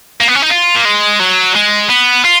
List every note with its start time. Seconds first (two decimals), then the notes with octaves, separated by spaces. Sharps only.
0.21 A#3
0.28 B3
0.35 C#4
0.42 D#4
0.50 F4
0.76 A#3
0.85 G#3
1.20 F#3
1.55 G#3
1.90 B3
2.25 F4